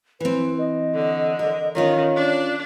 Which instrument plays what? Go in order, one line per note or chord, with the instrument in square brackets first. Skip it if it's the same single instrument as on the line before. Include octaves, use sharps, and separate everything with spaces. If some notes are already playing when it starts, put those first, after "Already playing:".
[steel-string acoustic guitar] E3 C4 [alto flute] B4
[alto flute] D#5
[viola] D3
[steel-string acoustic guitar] A#4
[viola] D#3 [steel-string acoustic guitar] C#4 F4 A#4 [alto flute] C#5
[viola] D4